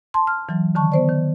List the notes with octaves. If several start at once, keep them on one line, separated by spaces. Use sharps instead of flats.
A5 C6
F6
E3 F#3
D3 D#3 A5 C#6
B3 C5 D5
D#3